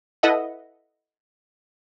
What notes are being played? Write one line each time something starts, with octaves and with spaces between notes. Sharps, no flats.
E4 A4 B4 D#5 E5 F#5